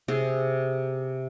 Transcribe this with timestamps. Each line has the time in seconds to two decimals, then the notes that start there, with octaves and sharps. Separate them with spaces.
0.08 C3 G#4